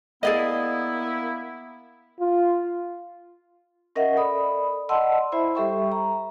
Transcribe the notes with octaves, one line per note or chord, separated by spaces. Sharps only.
A#3 B3 E4 G#4 D5 D#5
F4
C#4 A#4 D#5 E5 F#5
A4 D5 B5 D#6
D5 D#5 F#5 A5 C6 E6
E4 C5 E5 B5
G3 G4 A4 E5 G5 C#6
A#5